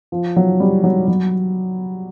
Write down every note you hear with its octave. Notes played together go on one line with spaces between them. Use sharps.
F3
F#3
G3
F#3
F#3